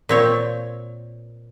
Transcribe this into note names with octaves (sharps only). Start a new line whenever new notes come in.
A#2 C4 C#5